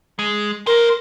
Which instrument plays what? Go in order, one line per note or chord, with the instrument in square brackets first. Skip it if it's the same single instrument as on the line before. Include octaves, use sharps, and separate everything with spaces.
[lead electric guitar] G#3
[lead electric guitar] A#3 C5 [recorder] A#4